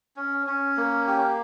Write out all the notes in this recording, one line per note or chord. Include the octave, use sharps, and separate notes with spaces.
C#4
C#4
A#3
G4